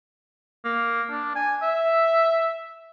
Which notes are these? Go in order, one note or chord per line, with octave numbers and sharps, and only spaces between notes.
A#3
D4
G#5
E5